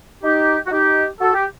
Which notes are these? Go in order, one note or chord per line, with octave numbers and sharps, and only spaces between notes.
D#4 G4
F#4
D#4 G4
F#4 A4
G4